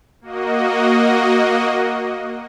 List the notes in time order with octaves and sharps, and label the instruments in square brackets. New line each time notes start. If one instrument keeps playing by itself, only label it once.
[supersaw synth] A#3 F#4 D#5